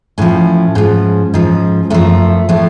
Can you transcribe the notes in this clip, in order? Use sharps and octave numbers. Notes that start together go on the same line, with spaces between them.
A2 F3 C#4
G#2 F3
G#2 F3
F#2 F3 A3
A2 F3 A3